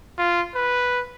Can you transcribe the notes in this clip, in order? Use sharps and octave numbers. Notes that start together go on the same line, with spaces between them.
F4
B4